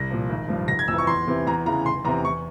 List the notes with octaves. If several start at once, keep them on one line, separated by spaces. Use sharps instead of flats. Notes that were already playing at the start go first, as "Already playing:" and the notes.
Already playing: C2 A#6
A#2 F3
G#1
G2 F3
F1 A#6
G#6
F2 E3 E6
C#6
E2 C6
C3 E3
E2 A#5
C#3 E3 A#5
F1 C6
E2 C3 A#5
E2 C#6